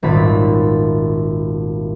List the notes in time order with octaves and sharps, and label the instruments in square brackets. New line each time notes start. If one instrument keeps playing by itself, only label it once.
[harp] D#1 G#1 A#2 B5 A6